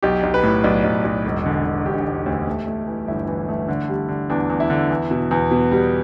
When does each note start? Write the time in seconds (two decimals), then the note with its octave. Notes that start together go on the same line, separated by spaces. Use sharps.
0.03 B1 G4
0.23 B1
0.34 B4
0.43 A2
0.64 B1 D5
0.84 B1
1.05 B1
1.25 E1
1.46 D3
1.66 D3
1.86 E1 G4
2.06 E1
2.26 D2
2.47 A3
2.67 A3
2.87 E3
3.08 G1 E4
3.28 E3
3.48 A3
3.68 D3
3.89 G3
4.09 D3
4.30 E2 D4
4.50 E2
4.60 E4
4.70 D3
4.90 E2
5.11 B2
5.31 E2
5.51 B2
5.72 G3